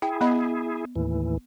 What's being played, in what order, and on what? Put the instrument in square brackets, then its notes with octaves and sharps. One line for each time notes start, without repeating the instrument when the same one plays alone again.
[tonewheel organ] E4 G#4 [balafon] G5
[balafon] B3 D#5 B5
[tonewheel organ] D#2 A2 E3